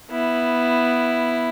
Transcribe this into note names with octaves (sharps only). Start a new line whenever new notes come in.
B3 E4